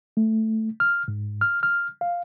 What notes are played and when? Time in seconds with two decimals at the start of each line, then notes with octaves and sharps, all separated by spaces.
0.17 A3
0.80 F6
1.08 G#2
1.41 F6
1.63 F6
2.01 F5